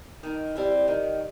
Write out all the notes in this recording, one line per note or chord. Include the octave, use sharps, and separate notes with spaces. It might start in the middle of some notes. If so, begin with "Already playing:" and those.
D#3
G3 C4 E4
D#3